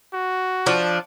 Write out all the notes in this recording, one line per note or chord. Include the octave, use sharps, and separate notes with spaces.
F#4
F3 D4